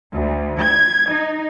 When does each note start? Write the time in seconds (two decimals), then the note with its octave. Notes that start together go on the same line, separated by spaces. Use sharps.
0.12 D2
0.60 G#6
1.10 D#4